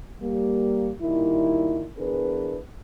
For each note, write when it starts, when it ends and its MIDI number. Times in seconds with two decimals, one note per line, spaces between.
0.21 0.91 55
0.21 0.91 58
1.02 1.87 46
1.02 1.87 51
1.02 1.87 55
1.02 1.87 64
1.97 2.57 52
1.97 2.57 59
1.97 2.57 62
1.97 2.57 68
1.97 2.57 70
1.97 2.57 71